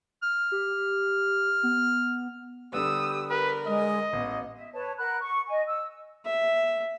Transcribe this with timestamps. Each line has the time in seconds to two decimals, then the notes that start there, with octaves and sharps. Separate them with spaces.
0.23 F6
0.52 G4
1.63 B3
2.73 D3 G3 B3 G4 D#6 E6
3.30 A#4 B4
3.67 G#3 D#5
4.13 A1 B3
4.54 E5
4.73 B4 C#5 A5
4.98 A#4 F#5 B5 F#6
5.20 C#6
5.49 D#5 G#5
5.67 E6
6.25 E5